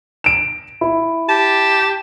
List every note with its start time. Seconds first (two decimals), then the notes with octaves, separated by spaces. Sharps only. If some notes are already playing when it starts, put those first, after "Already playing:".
0.24 D7 E7
0.81 E4
1.29 G4 A5